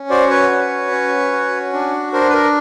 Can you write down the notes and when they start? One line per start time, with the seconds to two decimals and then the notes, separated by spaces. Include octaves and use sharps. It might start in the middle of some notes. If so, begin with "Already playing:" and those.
Already playing: C#4
0.10 F#4 C5 D5
0.30 B4 C#5
0.51 C#4
0.91 C#4
1.32 F#4
1.73 D4
2.13 D4 A#4 C5
2.29 B4
2.34 A#4